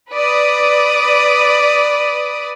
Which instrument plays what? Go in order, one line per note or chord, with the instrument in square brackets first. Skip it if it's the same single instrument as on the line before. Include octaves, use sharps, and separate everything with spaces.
[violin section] B4 D5 D#6